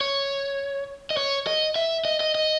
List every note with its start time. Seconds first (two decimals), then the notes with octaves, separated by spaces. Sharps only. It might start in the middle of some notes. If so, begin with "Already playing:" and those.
0.01 C#5
1.11 D#5
1.17 C#5
1.47 D#5
1.76 E5
2.05 D#5
2.20 D#5
2.35 D#5